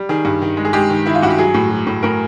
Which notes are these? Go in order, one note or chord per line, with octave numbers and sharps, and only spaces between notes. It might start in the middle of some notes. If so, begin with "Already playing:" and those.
Already playing: G3
D#3 G#4
G2
D#3
G#3
G#4
G#3 G4
D#3
D#3 E4
F4
G2 F#4
G4
F#3 G#4
A2
F#3
A2
A2 A#4